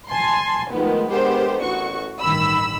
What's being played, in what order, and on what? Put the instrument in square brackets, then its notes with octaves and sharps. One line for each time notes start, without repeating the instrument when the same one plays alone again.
[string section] G#5 A5 C6
D#3 F3 G#3 A3 B3
G#3 B3 D4 G4 A#4 C5
A1 F#4 C#6
A1 G2 D#3 B5 E6